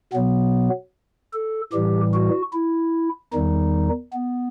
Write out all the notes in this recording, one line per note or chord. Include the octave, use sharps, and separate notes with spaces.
B2 F#3 B3
A4
A2 E3 G3 G4
F#4
E4
E2 D#3 G3 D#4
B3